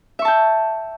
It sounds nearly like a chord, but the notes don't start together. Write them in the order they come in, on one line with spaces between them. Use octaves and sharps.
E5 C#6 A5 G5